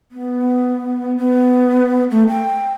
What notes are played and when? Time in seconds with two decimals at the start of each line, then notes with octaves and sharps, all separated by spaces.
0.12 B3
1.17 B3
2.11 A3
2.28 G5